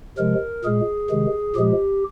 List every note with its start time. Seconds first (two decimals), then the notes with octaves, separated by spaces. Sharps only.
0.18 C3 F3 G#3 A#4
0.65 A#2 G#3 G#4
1.10 C3 D#3 G#3
1.55 A#2 F3 G#3 G4